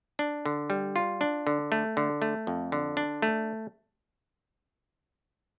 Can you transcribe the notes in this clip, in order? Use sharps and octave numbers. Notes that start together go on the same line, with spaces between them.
D4
D3
G3
F4
D4
D3
A3
D3
A3
F2
D3
D4
A3